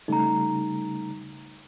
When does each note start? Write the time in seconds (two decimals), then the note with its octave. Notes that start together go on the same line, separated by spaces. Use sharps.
0.08 C#3 G3 A3 D#4 A#5